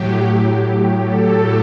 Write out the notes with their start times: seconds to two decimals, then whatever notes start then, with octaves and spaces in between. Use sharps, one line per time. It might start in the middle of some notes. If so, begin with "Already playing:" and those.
Already playing: A2 F#3 G4
0.14 G4
0.57 G4
1.03 A4